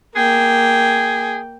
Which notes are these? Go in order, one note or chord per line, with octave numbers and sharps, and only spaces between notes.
A#3 G#4 G5